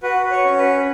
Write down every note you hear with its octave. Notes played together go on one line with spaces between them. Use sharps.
F#4 B4
C#5
C#4
B4